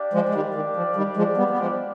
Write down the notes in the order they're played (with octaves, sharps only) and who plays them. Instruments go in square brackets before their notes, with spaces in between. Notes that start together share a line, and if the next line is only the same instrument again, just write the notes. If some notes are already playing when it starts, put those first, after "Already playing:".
Already playing: [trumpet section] D4 G4 D5 F5
[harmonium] F3 G#3
G#3
D#3 G3
D#3
F3
D#3 G3
F3 G#3
G3 B3
B3
F3 G#3